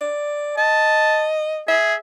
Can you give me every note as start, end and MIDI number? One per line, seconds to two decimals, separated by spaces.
0.01 0.55 74
0.57 1.62 75
0.57 1.27 81
1.68 1.94 68
1.68 1.96 76